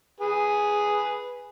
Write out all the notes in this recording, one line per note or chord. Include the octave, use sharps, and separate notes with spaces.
G#4 B4